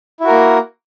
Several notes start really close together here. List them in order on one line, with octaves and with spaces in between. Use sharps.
E4 F#4 A#4 A#3